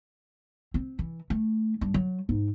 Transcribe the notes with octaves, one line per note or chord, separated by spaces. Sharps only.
C4
E3
A3
G2
F#3
G#2